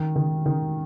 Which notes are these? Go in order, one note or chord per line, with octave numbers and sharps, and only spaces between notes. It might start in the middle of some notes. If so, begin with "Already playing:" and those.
Already playing: D#3
D#3
D#3